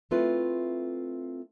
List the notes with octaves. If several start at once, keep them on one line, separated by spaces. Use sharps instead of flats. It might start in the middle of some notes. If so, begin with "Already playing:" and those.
A3 C4 E4 F4 A4 B4